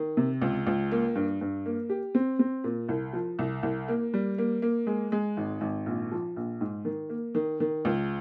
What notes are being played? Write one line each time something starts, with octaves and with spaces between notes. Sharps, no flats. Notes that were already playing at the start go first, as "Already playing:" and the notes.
Already playing: D#3
C3
C#2
C#2
A#3
G2
G2
A#3
G4
C4
C4
A#2
C2
F3
C2
C2
A#3
G3
A#3
A#3
G#3
G#3
G#1
G#1
A#1
F3
A#1
G#2
D#3
A#3
D#3
D#3
C#2